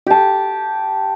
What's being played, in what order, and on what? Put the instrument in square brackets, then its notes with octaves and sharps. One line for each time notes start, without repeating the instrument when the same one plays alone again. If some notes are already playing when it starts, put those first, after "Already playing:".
[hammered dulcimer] G4 A5